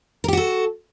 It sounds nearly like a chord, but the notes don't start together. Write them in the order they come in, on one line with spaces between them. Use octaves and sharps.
A#4 G4 F#4 A4